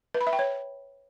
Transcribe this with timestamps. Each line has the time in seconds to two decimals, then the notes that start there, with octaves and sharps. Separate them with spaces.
0.14 B4
0.21 B5
0.27 E5
0.33 G5
0.39 C#5